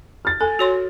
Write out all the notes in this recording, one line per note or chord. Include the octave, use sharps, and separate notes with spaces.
F6 A6
A4 G#5
F#4 C#5 C6